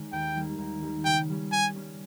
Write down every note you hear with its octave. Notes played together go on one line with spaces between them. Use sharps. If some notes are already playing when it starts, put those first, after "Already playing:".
Already playing: D#3 G#3 C#4
D#2 G5
D#3 G3 A#3
D#2
D#3 G3 A#3
C#3 G5
G3 C#4
C#3 G#5
G3 C#4